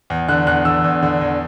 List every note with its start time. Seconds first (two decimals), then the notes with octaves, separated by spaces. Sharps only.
0.10 E2
0.28 D3 F#6
0.47 E2 F#6
0.65 D3 E6
0.84 E2
1.03 D3
1.21 E2